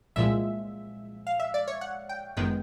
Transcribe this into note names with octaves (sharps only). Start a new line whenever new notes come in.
C2 A#2 F3 G#3 E5
F5
E5
D5
C#5
F#5
G5
G1 F#2 D#3 G#3 B3 G5